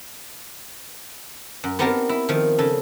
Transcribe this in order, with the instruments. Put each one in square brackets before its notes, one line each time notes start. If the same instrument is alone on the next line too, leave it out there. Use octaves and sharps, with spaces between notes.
[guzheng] F#2
B3 C4 D#4 G4 A#4 A5
E4
D#3 F3
C#3 A4